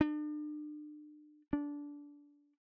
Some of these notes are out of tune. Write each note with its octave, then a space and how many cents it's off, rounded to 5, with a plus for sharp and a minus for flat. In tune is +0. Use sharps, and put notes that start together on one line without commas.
D4 +40
D4 -20